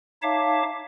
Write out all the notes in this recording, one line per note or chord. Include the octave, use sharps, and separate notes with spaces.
D#4 C#5 E5 F5 A5 D6